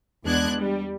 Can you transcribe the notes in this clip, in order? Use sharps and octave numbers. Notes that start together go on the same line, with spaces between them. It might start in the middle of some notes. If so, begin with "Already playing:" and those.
E2 G#3 B3 D4 F#6 G#6
G3